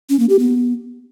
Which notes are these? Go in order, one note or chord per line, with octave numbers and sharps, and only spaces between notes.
C#4
A#3
G4
B3